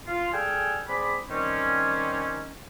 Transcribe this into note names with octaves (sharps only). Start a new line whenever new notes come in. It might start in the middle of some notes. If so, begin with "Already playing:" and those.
F4
G3 G#4 A4 G5 G#5 F6
C4 G#4 D5 B5
D#3 G3 C4 C#4